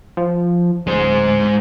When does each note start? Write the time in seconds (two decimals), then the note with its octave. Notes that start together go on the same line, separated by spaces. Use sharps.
0.17 F3
0.87 D1 G#3 C5